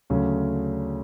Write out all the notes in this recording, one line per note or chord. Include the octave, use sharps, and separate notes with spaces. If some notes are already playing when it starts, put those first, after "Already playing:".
D2 C#3 F#3 A3 C#4